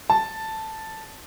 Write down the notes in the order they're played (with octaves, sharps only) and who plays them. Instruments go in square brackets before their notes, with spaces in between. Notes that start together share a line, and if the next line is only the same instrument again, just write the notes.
[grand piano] A5